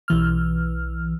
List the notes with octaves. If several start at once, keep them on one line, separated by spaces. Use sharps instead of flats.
B1 E3 F6